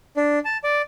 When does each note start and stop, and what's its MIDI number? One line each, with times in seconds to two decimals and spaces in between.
0.17 0.39 62
0.45 0.57 81
0.64 0.82 74